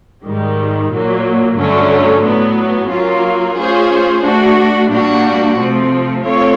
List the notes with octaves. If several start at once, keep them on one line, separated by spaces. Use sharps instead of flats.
G#2 D#3 G3
A#2 F#3 A#3
G2 D3 F#3 A3 C#4
A2 F#3 B3
F#3 A#3 C#4 F4
A3 C#4 F4 G#4 C5
A3 D4 F#4
A#2 G3 A#3 D4 F#4
C3 F3 A3 C4
A3 C4 F4 A4 C#5